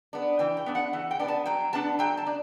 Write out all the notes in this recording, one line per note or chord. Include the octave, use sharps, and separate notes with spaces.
B3 D4
E3 G5
G5
B3 D4
F#5
E3 F#5
G5
B3 D4
A5
F#3 G5
B3 D4 A5
F#3 G5
A5
D4